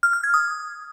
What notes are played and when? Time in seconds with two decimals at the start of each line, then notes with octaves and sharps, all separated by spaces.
0.03 F6
0.13 F6
0.24 G#6
0.34 D#6